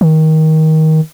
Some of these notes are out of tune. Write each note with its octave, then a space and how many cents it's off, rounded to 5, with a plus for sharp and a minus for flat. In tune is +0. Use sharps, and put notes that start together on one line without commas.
D#3 +20